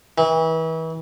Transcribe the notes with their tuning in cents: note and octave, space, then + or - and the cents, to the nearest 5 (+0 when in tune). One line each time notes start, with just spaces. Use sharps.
E3 -35